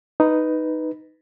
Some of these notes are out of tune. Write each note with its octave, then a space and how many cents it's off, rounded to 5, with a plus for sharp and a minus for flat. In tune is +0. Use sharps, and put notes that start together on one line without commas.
D#4 +0 B4 +0